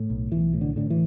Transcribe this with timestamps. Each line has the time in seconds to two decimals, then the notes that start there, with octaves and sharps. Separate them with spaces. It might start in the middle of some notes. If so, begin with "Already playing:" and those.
Already playing: A2
0.10 B1
0.32 B1 E3
0.54 A2
0.61 D3
0.76 A2 D3
0.90 E3